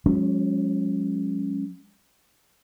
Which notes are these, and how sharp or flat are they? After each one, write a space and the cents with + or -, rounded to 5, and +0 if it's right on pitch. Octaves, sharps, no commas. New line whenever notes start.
F3 +45 G#3 -20 C#4 +0